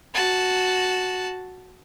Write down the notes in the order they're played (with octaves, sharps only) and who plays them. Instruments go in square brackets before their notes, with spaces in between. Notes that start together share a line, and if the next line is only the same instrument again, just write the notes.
[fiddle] F#4 A5